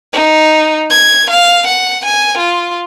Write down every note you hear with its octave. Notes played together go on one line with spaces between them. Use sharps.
D#4
G#6
F5
F#5
G#5
F4